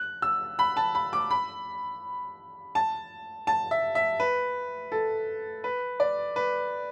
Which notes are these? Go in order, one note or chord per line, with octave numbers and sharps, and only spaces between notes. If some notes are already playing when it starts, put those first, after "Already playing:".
Already playing: F#6
E6
B5
A5
B5
D6
B5
A5
A5
E5
E5
B4
A4
B4
D5
B4